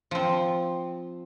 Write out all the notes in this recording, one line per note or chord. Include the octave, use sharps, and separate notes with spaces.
F3 C4